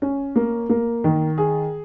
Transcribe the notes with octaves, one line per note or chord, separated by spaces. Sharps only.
C#4
A#3
A#3
D#3
G#4